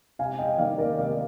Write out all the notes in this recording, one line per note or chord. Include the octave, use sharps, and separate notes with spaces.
C3 F5 G#5
D#5 G5
D#3 A#3 D5 F5
A#4 D5
C3 D5 F5